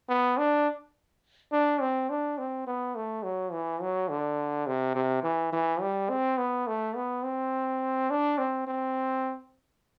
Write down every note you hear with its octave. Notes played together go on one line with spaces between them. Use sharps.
B3
D4
D4
C4
D4
C4
B3
A3
F#3
E3
F#3
D3
C3
C3
E3
E3
G3
C4
B3
A3
B3
C4
D4
C4
C4